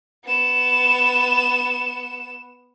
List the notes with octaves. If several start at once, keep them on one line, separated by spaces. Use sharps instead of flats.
B3 E7